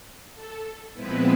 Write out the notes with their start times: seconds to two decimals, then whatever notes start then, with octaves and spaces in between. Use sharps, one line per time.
0.34 A4
0.93 A#2 F3 G#3 B3 C4 E4 B4